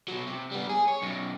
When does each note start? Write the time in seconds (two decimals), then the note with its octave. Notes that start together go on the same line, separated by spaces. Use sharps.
0.08 B2 F#3
0.27 C3
0.52 G3 B3
0.69 G#4
0.88 C#5
1.02 F#2 B2